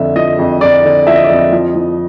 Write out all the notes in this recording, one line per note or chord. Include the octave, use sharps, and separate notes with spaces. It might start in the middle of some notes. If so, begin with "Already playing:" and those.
Already playing: F2 D3 E5
F3 D#5
F2
F2 D5
D3
F3 E5
D#5
D5
F2 D#5
F3
F3